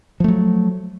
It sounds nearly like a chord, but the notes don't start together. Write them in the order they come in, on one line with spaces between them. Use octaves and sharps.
F3 A3 F#3